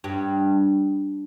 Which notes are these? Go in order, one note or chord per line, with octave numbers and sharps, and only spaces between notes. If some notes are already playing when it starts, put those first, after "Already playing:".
G2